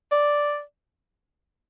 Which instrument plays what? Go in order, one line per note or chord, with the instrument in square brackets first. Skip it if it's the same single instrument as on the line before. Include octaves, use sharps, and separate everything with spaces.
[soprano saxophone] D5